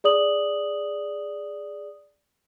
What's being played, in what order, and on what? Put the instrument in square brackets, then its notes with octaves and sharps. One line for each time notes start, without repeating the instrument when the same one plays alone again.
[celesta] G#4 D5 D#6 F#7